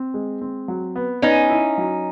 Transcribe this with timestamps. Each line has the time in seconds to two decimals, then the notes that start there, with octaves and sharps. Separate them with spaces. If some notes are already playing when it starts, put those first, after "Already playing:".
Already playing: C4
0.14 G#3
0.41 C4
0.68 F#3
0.96 B3
1.22 B3 C#4 D#4
1.50 E4
1.78 F#3